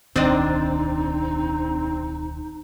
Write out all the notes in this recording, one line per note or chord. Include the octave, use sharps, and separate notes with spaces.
D1 B1 D#3 C4 D4 D#4 D5 D#5